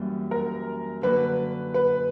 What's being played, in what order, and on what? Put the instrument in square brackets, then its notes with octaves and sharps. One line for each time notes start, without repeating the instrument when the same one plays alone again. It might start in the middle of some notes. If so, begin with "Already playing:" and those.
Already playing: [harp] F#2 E3 G3 A#3
[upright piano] A#4
[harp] D3 F#3 A#3 D4 F#4 [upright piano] B4
[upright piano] B4